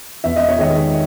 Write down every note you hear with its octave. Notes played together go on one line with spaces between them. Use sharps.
E2 E5
D#5
C#5
D#3 G#3 D#5